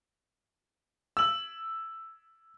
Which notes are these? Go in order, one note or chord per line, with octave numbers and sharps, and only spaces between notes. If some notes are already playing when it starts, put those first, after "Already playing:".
E6 F#7